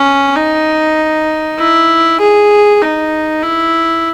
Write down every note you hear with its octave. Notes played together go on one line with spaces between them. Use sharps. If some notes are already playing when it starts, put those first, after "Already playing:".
Already playing: C#4
D#4
E4
G#4
D#4
E4